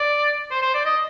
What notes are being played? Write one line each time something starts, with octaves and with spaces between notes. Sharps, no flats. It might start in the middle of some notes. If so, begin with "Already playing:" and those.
Already playing: D5
C5
C5
D5
D#5